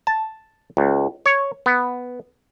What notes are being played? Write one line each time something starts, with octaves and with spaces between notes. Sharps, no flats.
A5
C#2
C#5
B3